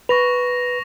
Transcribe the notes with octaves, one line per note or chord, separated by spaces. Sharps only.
B4 C#6 A#6 F7